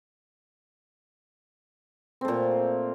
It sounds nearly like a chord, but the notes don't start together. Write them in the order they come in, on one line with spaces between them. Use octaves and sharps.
C4 A3 A#2